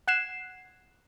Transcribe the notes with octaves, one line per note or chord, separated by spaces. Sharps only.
F#5 F#6 G#6 C7 E7